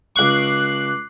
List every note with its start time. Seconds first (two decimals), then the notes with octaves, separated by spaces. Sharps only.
0.16 C#2 C#6 D6 F#6 C7